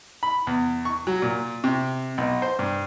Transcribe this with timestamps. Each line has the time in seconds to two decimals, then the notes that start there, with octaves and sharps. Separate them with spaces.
0.23 B5
0.47 E2
0.85 C#6
1.07 F#3
1.22 A#2
1.64 C3
2.18 B1
2.42 C5
2.59 G2